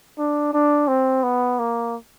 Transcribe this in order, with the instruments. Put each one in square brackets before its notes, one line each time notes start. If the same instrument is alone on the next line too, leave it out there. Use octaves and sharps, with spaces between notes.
[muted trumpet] D4
D4
C4
B3
A#3